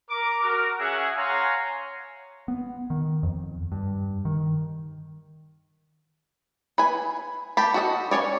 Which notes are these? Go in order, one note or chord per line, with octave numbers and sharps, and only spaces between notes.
A#4 D6
F#4 A#4
C#4 G#4 E5 F#5
C#5 F5 F#5 G#5 A#5 C6
B3
D#3
F2
G2
D#3
B4 G#5
G4 A5 B5
F#4 A4 D#5
C#4 C#5 D5